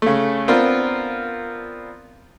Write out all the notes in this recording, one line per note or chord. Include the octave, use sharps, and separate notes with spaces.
C#3 A3
B3 C4 D4 F4 A#4